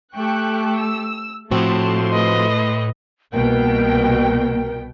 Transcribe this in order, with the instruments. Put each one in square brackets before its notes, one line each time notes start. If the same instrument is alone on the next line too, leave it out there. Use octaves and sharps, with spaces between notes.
[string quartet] A3 G4 A4 [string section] G5 C#6 F#6
[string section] E6
[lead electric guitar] A2 [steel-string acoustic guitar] F3 C4 F#4 [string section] A3 C6 [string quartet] A5
[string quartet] B4 D#5
[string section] C2 B2 G5 [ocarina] A#3 [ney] A#4